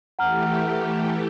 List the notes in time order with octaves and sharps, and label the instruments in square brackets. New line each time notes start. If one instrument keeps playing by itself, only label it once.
[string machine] E3 A3 G4 [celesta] F#5 A#5 F6